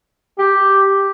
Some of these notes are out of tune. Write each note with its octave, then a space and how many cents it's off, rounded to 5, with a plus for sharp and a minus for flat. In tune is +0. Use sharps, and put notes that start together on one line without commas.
G4 +0